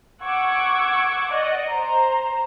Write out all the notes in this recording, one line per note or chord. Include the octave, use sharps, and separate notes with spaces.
F#5 C#6 D6 E6 G#6
D5 D#5 F#5
C5 A#5